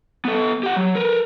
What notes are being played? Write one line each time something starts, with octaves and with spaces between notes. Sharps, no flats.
B3 A4
G4 F#5
F#3
A#4 B4